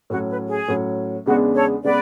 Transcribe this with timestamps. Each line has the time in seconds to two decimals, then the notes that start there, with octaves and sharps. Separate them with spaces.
0.10 A2 F#3 C#4 F#4
0.29 B4
0.49 G#4
0.68 A2 F#3 C#4
1.26 E2 C#3 G#3 B3 D4 F#4
1.54 A4 C#5
1.83 C#3 G#3 B3 B4 D5